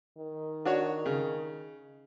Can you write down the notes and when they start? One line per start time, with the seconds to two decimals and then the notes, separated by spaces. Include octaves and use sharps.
0.17 D#3
0.65 D4 F#4 C#5
1.06 C#3